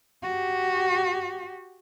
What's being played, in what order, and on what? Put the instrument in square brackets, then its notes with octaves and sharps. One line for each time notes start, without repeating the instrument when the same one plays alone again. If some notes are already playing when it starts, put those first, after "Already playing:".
[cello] F#4 G4